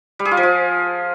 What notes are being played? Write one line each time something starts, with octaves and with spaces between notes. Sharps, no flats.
G3
G#4
F4
F3
F4